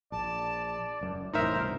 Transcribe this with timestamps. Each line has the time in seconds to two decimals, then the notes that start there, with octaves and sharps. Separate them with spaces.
0.12 A#1 D5 A5
1.01 F#1 F#2
1.33 F1 A2 E3 D#4 A#4 C5 E5
1.56 C2 G2 B2